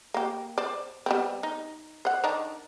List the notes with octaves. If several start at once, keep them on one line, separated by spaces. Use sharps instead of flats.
A#3 G4
C5 D5
G3 B3 C4
D#4
C5 F#5
D#3 D4 A#5